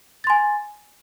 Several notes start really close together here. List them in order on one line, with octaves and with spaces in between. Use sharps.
A6 C6 G#5